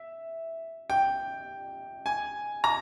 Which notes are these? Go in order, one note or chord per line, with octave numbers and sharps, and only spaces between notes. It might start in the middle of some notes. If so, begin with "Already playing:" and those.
Already playing: E5
G5
G#5
A#5